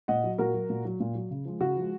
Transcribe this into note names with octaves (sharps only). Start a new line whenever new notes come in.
A#2 D#5 F#5
F#3
A#2 F#4 A#4
F#3
A#2
F#3
A#2
F#3
C#3
F3 G#3
C#3 F#4
F3 G#3